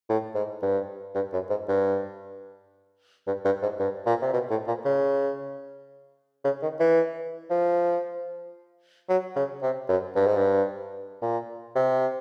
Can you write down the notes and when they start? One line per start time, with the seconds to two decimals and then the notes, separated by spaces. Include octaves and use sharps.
0.09 A2
0.35 G#2
0.62 G2
1.15 G2
1.33 F#2
1.50 G#2
1.68 G2
3.27 G2
3.45 G2
3.62 G#2
3.80 G2
4.06 A#2
4.22 C3
4.33 B2
4.50 A2
4.67 A#2
4.85 C#3
6.44 C#3
6.62 D#3
6.80 E3
7.50 F3
9.09 F#3
9.36 C#3
9.62 C3
9.89 F#2
10.16 G2
10.26 G#2
10.37 G2
11.22 A#2
11.75 C3